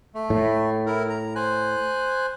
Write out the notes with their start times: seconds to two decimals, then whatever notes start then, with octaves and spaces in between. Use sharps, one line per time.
0.15 A3
0.30 A2
0.86 E4 A#4
1.10 A#5
1.36 C5 G#5 F#6